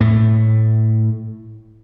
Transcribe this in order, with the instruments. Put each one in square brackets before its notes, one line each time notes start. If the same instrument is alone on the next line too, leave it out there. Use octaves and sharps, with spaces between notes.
[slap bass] A2 A3